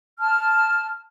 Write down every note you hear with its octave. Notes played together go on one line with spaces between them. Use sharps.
A5 F6